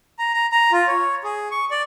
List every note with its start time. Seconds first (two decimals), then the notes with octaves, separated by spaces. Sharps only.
0.19 A#5
0.34 A#5
0.52 A#5
0.72 F4
0.87 C#5
1.24 G#4
1.51 C#6
1.71 D5